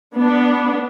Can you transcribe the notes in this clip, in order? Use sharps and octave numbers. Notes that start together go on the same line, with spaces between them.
B3 D4